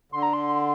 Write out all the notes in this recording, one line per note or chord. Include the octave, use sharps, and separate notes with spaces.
D3 C6
A#5
C6